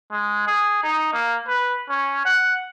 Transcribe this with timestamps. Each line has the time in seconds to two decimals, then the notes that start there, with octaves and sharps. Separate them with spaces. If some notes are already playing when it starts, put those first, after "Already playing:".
0.12 G#3
0.47 G#4
0.83 D#4
1.13 A#3
1.47 B4
1.89 C#4
2.25 F#5